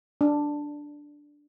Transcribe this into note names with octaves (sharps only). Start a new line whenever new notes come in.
D4